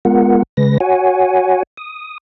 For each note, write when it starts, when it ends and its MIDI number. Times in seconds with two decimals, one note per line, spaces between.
0.05 0.43 56
0.05 0.43 59
0.05 0.43 65
0.05 0.43 70
0.05 0.43 78
0.57 0.78 49
0.57 0.78 56
0.57 0.78 71
0.57 0.78 94
0.80 1.63 66
0.80 1.63 73
0.80 1.63 78
0.80 1.63 80
1.77 2.18 87